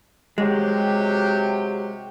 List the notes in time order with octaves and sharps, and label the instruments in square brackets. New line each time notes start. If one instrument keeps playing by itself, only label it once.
[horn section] C3 F#3 G4 [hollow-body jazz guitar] G#3